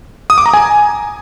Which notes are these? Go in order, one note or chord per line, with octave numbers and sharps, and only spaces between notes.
D#6
D6
A#5
G#5